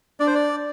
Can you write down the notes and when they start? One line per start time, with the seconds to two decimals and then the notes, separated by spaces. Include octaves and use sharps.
0.20 D4 D5
0.27 C5
0.35 D5